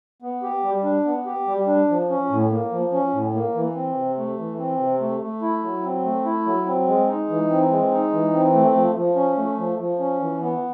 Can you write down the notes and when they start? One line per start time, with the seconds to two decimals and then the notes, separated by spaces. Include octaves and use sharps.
0.22 B3
0.43 G4
0.63 G3
0.84 D4
1.05 B3
1.26 G4
1.47 G3
1.67 D4
1.89 F3
2.09 C#4
2.30 A2
2.51 A#3
2.71 F3
2.92 C#4
3.13 A2
3.34 A#3
3.54 E3
3.75 C4
3.96 C3
4.17 A3
4.38 E3
4.59 C4
4.80 C3
5.00 A3
5.21 A3
5.42 E4
5.63 F#3
5.83 C4
6.04 A3
6.25 E4
6.46 F#3
6.66 C4
6.87 G#3
7.08 D#4
7.29 E3
7.50 C4
7.70 G#3
7.91 D#4
8.12 E3
8.33 C4
8.53 A3
8.75 F3
8.95 F3
9.16 C#4
9.37 A3
9.58 F3
9.79 F3
9.99 C#4
10.20 E3
10.41 B3